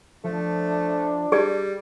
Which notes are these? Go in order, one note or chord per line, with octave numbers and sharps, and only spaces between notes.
F3 A3 D4
G3 G#4 D5